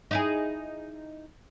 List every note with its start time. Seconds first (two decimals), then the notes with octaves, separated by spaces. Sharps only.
0.11 D#4 E4 G#4